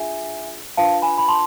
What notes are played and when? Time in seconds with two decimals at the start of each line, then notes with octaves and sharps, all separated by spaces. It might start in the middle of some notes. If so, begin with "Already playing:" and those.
Already playing: D4 F4 G#4 E5 G#5
0.77 D4 F4 B4 F5 A5
1.02 G#5 B5
1.18 B5
1.28 A5 C6